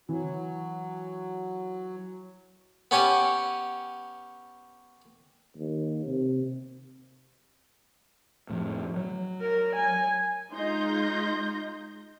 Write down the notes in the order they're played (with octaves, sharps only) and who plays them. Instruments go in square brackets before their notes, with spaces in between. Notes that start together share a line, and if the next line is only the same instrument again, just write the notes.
[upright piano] E3 [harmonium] F#3
[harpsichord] B3 C#4 G4 G#5
[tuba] D#2
C3
[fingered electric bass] F2 A2
F#3
[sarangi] A#4
G#5
[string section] G#3 D#4 F4 C6 G6 A#6